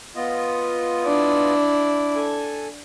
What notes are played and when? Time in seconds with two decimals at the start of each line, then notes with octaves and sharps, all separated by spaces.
0.16 B3 F4 D#5
1.05 D4 E4
2.16 A4 G#5